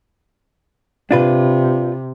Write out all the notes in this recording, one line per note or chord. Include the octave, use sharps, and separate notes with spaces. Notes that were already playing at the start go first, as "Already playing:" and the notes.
C3 D4 F4 B4